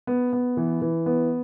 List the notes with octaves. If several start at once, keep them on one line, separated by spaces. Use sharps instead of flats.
B3
B3
E3
E3
B3